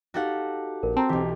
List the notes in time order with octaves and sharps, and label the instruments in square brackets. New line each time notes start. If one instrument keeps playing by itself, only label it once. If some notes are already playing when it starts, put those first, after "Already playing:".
[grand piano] D#4 G4 F5 [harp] F#4 A4 F#5
[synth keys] A#1 [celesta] A#4
[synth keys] C4 [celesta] A5 A#5
[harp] B1 E3 [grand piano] G4